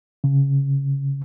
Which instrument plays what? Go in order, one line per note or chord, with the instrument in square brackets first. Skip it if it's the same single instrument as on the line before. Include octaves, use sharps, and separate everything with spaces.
[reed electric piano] C#3